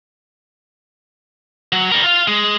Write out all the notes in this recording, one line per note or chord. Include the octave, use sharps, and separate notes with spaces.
F#3
G3 A#4
F4 F5
G#3